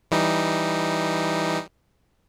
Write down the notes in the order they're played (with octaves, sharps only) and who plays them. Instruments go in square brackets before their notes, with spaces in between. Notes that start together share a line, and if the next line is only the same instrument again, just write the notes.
[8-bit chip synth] E3 G3 D#4